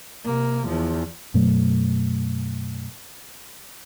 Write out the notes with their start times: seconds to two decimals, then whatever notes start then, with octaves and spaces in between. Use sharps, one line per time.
0.25 C3 A#3
0.68 E2 F3
1.34 F#2 B2 F#3 A3